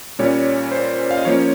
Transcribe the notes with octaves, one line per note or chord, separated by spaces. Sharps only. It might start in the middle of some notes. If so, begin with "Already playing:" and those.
A#2 G3 C#4 C#5
C5
F5
D#5
F3 A#3 C#4 C#5